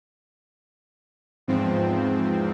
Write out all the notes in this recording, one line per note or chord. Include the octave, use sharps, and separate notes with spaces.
E2 G#2 F3 C4